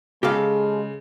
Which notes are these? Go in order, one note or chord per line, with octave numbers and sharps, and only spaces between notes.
C#3 G#3 G4 A4 F5